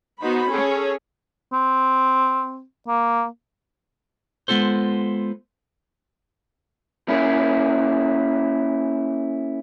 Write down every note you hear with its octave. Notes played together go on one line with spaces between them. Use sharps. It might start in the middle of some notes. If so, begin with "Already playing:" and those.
B3 D#4 F#4 C5 B5
C#4 G#4 A4 C#5
C4
A#3
G#3 B3 F4 A4 C5
A#3 C#4 E4 G#4